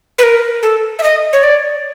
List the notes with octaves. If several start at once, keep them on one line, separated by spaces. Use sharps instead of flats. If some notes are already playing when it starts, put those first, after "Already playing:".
B4
A#4
A4
E5
D#5
C#5
D5